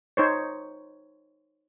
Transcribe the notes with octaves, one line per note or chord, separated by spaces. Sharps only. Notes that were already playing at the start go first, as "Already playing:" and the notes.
D#4 C5 C#5